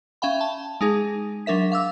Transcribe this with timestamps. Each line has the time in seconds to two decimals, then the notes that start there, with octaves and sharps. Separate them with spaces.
0.22 C#4 E5 F5 G5 B5
0.41 A5
0.81 G#3 D#4 G#4
1.46 F#3 D4 A#4 E5 B6
1.72 F5 D6 E6